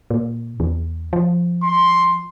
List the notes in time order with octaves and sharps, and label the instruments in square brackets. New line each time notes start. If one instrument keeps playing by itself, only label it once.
[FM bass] A#2
E2
F3
[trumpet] C6